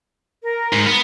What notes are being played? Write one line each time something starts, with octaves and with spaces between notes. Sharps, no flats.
A#4
G#2
B3